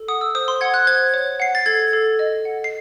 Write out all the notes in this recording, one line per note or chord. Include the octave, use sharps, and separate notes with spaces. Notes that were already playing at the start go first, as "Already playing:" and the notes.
Already playing: A4
F#5 D#6
E6
C5 D#6
C6
F#5 G#6
F#6
C5 G#6
C#5
F#5 C7
A6
A4 G#6
A4
D#5
F#5
C7